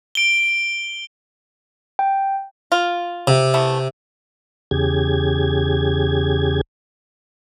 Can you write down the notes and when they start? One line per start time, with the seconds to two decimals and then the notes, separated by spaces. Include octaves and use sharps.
0.15 D7 G7
1.99 G5
2.72 F4
3.27 C3
3.54 E3 A3 B3
4.71 E2 C#3 G4 G#4 G#6